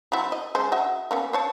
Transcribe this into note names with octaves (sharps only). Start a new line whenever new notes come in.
F#3 C4 E4
D#5
G#3 C#4 C5
F#4 D#5 E5
A#3 B3 C#4
C5 C#5 A5